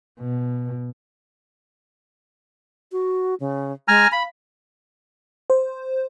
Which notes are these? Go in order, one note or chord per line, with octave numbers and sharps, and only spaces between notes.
B2
F#4
C#3
G#3 G#5 A#5 F6
F5 B5
C5